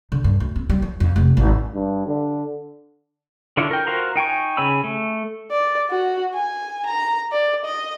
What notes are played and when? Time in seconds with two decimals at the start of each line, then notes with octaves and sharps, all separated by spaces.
0.12 D3
0.24 G2
0.40 D2
0.56 C4
0.70 G3
0.82 F3
1.00 F2
1.16 F1
1.37 G#1
1.74 G2
2.07 D3
3.57 D3 D4 E4 F4 C#5
3.71 A#4 G5
3.87 F4 F#4 A#4 C5 A#5
4.16 D#4 G5 G#5 C#6
4.57 C#3 C#5 G#5 B5 E6
4.84 A3
5.51 D5
5.90 F#4
6.34 G#5
6.86 A#5
7.32 D5
7.65 D#5